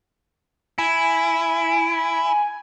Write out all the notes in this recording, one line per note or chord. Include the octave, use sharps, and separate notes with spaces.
E4 G#5